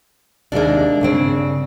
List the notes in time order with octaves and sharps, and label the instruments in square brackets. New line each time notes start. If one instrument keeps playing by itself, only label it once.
[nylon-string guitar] D#2 C3 G#3 [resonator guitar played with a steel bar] A#3 D4
[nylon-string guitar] G2 C#3 C4